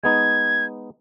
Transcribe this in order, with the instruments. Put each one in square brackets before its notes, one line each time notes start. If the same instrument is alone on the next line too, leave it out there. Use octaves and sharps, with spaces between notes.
[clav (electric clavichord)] G#3 B3 D#4 [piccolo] G#6